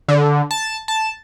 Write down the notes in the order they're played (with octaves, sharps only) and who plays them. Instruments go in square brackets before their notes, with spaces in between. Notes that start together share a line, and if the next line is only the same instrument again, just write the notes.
[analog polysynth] D3
A5
A5